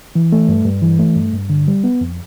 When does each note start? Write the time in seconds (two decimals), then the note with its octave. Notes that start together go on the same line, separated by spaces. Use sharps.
0.15 E3
0.32 A3
0.49 G2
0.65 G2
0.82 E3
0.99 A3
1.16 G2
1.33 G2
1.50 D3
1.68 G3
1.84 B3
2.01 F2